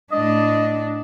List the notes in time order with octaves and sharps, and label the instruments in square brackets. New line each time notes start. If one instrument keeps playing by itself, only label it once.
[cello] A2 D4 [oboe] D#5